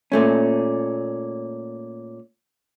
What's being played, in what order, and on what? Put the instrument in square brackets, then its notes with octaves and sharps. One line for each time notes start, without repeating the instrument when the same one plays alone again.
[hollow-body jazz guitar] A#2 A3 C#4